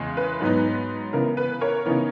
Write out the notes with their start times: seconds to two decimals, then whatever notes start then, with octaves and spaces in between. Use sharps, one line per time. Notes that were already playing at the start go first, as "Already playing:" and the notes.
Already playing: E2 C#3 G#3
0.17 B4
0.41 G#2 F#3 B3 D#4
1.13 C#3 E3 B3 A#4
1.37 B4
1.61 A#4 C#5
1.86 C#3 E3 B3 D#4